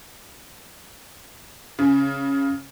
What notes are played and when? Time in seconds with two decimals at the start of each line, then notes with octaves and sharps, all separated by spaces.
1.79 C#3